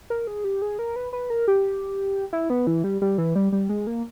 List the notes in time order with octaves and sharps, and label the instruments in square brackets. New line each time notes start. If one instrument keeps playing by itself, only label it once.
[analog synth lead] A#4
G#4
G4
G#4
A#4
B4
B4
A#4
G4
E4
B3
E3
G3
G3
E3
G3
G3
G#3
A#3